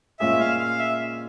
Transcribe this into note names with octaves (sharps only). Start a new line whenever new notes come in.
A#2 G#3 C#4 F4 G#4 E5
F5
F5
E5